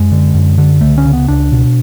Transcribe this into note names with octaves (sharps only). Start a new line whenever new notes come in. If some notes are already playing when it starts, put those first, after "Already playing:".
Already playing: F#2 G#3
D3
F#2
D3
C#2 A3
C#4
C#3
B3
C#2 D4
B2